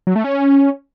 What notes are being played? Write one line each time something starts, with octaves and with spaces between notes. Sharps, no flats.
F#3
A3
C#4